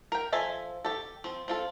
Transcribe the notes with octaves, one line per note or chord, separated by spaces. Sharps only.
A#4 G5
F3 A4 E5 G#5
G4 A4
F3 C4
C4 F4 A4